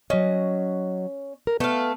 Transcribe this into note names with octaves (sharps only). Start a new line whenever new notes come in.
F#3 C#4 D#5
A#4
A3 B3 F5